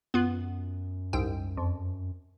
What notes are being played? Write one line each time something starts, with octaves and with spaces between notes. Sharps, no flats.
F#2 B3 F4
C2 G#2 G5
F2